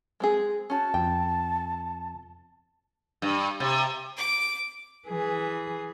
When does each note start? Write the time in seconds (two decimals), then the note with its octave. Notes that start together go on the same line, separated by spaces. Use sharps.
0.20 G#3 C4 G#4
0.70 C#4 F#4 A5
0.94 F2 G5
3.22 G2
3.60 C3
4.17 D6
5.08 E3 G#4